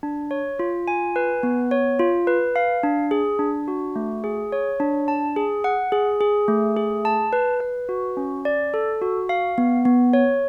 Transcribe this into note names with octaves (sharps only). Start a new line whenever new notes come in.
D4
C#5
F4
G#5
B4
B3
C#5
F4
B4
F5
D4
G#4
D4
F#4
A3
G#4
C#5
D4
A5
G#4
F#5
G#4
G#4
A3
G#4
A5
B4
B4
F#4
C#4
D5
A4
F#4
F5
B3
B3
C#5